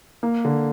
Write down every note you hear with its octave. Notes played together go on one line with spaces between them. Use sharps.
A#3
D3